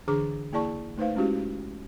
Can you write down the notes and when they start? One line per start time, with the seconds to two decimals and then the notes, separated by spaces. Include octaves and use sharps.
0.08 D3 E3 D4 G#4 A#5 D6
0.53 A#3 E4 G#4 D5 A5 C#6
0.98 A3 D#4 B4 C5 F5
1.16 G#3 C#4 E4 F#4 G4